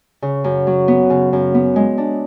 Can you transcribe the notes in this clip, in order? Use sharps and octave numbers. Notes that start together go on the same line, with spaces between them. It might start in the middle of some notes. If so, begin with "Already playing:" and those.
C#3
F#2
F#3
B3
C#3
F#2
B3
G#3
D4